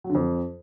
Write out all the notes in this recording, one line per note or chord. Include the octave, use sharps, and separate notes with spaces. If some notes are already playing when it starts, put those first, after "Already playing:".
F#3
D3
F2